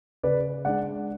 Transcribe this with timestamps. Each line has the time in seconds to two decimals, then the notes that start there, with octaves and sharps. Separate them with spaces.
0.23 C#3 B4 D5
0.65 G#3 D4 D5 F#5